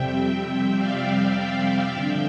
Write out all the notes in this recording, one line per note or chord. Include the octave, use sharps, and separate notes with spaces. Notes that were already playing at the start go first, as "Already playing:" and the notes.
Already playing: F2 C3 G3 C4 E5 G5
D5 F5
G2 D3 F3 E5 G5